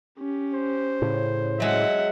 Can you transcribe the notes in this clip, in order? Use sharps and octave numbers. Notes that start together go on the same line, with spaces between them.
C#4 G4
C5
A2 C#3
F#3 G#3 E5 F#5